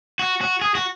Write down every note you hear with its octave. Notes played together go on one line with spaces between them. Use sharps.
F#4
F#4
G#4
F#4